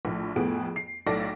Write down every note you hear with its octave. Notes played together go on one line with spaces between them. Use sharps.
A#1 A2
F2 A2 B3 G#4 D7
C7
B1 A2 A4 D5 A#6 D7